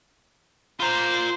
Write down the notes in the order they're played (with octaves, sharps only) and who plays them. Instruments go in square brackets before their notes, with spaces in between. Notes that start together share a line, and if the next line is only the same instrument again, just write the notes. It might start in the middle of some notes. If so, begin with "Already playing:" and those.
[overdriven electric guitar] F4 A#5 [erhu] C5